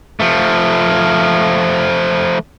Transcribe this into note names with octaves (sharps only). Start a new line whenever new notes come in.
F3 A3